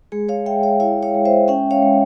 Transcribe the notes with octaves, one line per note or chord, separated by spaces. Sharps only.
G#3 G#4
C#5 F5
G#3 E5 G5
C#5 F5
E4 C#5 F5
C#5 F5
G#3
C5 E5
C#4 E5 G5
C#5 F5
G#3